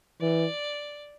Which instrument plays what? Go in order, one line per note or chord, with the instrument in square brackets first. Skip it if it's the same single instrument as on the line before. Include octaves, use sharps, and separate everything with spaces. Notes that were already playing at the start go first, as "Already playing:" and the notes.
[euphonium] E3 [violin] D5